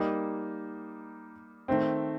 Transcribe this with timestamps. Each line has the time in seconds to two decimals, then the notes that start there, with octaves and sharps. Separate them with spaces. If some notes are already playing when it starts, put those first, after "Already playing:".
Already playing: G3 A#3 D#4
1.68 D#3 A3 C4